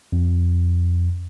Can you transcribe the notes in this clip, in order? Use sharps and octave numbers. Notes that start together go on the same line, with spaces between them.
F2